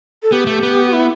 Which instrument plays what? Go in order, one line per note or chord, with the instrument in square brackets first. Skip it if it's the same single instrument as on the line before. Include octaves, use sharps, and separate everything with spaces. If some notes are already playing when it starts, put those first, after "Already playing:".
[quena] A4
[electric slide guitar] B3 [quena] G4
[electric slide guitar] A3
B3
[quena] F#4
E4